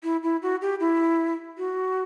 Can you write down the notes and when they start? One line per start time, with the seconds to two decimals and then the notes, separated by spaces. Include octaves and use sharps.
0.04 E4
0.23 E4
0.42 F#4
0.62 G4
0.80 E4
1.58 F#4